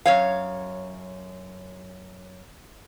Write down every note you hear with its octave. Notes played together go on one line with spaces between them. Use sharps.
F#2 C#5 F5